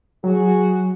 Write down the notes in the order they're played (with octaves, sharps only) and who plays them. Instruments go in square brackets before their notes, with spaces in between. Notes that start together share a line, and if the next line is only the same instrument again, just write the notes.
[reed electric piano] F#3 [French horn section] F#4 G#4